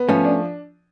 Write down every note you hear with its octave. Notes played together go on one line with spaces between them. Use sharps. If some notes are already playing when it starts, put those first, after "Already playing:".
Already playing: B3
F3 A3 C#4
D4